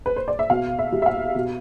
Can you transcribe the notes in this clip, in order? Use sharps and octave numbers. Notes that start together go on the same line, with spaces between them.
B4
C5
D5
E5
B2 F5
E5
G3
E5
F5
B2